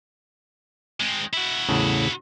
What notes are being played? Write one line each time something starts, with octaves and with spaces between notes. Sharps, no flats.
G#3 C4
E4 F#4
E2 A2 C#3